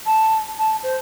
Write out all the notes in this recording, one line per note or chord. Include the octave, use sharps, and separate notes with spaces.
A5
A5
C5